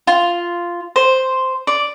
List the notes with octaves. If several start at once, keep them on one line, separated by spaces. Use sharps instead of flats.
F4
C5
D5